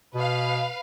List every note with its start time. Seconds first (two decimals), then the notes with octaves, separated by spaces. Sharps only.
0.15 B2 B4 F5